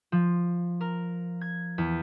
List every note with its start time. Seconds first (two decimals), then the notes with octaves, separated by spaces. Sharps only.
0.12 F3
0.81 A#4
1.41 G#6
1.78 E2